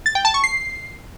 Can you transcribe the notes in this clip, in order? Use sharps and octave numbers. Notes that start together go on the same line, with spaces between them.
A6
G5
A5
C#6
C7